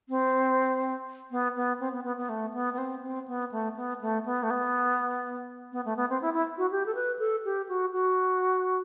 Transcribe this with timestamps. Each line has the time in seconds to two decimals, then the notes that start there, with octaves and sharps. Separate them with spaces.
0.09 C4
1.31 B3
1.56 B3
1.80 C4
1.92 B3
2.04 B3
2.18 B3
2.29 A3
2.54 B3
2.74 B3
2.78 C4
3.02 C4
3.28 B3
3.52 A3
3.76 B3
4.01 A3
4.26 B3
4.43 A3
4.51 B3
5.72 B3
5.85 A3
5.97 B3
6.09 C4
6.22 E4
6.34 E4
6.58 F#4
6.71 G4
6.86 A4
6.95 B4
7.19 A4
7.45 G4
7.69 F#4
7.93 F#4